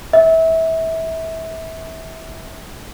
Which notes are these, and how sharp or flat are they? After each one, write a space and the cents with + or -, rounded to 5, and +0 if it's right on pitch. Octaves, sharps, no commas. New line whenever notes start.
E5 -25